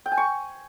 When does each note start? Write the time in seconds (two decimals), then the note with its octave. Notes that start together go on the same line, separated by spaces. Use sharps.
0.06 G5
0.12 G#5
0.17 C#6